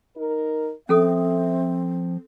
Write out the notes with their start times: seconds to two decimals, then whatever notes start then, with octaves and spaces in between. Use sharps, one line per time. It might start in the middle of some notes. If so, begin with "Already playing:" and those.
0.17 D#4 A#4
0.89 F3 C4 C#4 A4 E5 D#6